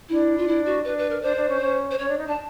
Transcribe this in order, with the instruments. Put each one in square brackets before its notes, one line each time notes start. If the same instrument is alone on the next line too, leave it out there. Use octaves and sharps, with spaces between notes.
[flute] D4 [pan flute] E4
[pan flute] F4
E4
F#4
[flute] D4 [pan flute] B4
[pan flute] B4
A#4
[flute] D4 [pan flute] C5
[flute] D4
C#4
C#4
[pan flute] C5
[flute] C#4 [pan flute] C#5
[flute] D4
D#4
[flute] D4 [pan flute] A5